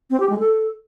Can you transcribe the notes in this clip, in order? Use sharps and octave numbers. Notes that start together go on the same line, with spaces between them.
C4
G4
G#3
A4